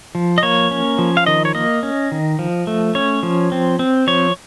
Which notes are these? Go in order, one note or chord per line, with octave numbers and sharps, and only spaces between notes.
F3
D#5
A#3 C#5
C#4
F3
F5
D#3 D#5
C#5
A#3 D#5
C#4
D#3
F3
A3
C#4 C#5
F3
C4
C4
F3 C#5